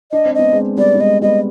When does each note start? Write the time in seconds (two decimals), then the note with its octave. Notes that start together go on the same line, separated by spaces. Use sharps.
0.12 D4 D#5
0.25 C4
0.35 B3 D#5
0.53 G#3 C4
0.77 G3 B3 D5
0.95 B3
1.00 G#3 D#5
1.22 G3 B3 D#5